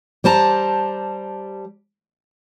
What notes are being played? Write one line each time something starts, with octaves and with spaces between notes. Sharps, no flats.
G3 C5 A5 A#5